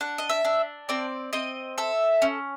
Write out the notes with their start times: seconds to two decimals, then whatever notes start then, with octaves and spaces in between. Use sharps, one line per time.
0.01 D4 F#5
0.18 D#5
0.30 E5
0.45 D4
0.89 C4 D5
1.33 C4 D#5
1.78 A4 E5
2.22 C#4